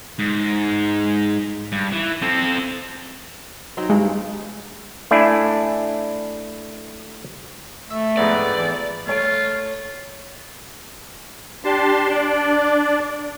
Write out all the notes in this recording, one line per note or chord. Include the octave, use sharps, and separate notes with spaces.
G#2
G2
E3
C4 A4
F#3 C4 D#4
G2 G#3
A3 D4 E4 G#5
A3 E5
F2 G#2 B3 D5
E3
A3 F4 C#5 D7
D4 G4 A5 C6
D4 D5